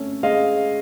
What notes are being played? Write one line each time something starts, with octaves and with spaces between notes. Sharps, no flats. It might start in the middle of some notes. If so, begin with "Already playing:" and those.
Already playing: A3 C#4
G#3 D#5 F5